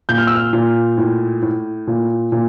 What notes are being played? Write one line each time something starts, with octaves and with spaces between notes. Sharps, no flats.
A#2 G6
F6
E6
F6
A#2
A2
A2
A#2
A#2